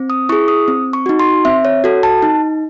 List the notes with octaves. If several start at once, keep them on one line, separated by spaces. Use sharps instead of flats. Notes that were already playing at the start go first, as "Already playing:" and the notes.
Already playing: C4
D#6
E4 G#4 C#6
D#6
C4
C#6
D#4 F#4
C6
C4 E5
C#5
F#4 A4
A5
D#4